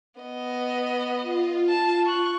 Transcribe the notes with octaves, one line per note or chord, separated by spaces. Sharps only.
B3 D#5
F4
A5
C#6 F#6